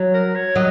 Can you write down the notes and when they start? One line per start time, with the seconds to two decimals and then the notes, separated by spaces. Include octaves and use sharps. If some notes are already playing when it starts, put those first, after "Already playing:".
Already playing: F#3
0.14 A#4
0.35 C#5
0.56 F#3 D#5